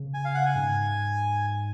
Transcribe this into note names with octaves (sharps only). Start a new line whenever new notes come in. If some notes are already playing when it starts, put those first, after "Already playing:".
Already playing: C#3
G#5
F5
F#5
G#5
G#2